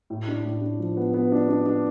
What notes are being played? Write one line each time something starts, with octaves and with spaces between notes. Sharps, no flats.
A2
D4
A2
D4
F3
B3
B3
D4
D4
D4